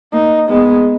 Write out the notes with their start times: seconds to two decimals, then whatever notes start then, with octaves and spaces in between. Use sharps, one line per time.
0.13 A#3 D#4
0.49 G#3 B3